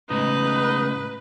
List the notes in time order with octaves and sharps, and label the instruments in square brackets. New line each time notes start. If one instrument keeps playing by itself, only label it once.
[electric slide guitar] A2 C#3 G#3 [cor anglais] D#4 [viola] B4